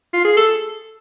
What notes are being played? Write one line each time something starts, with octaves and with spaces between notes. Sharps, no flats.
F4
G#4
A4